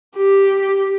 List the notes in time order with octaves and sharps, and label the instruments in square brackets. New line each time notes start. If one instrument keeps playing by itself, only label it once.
[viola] G4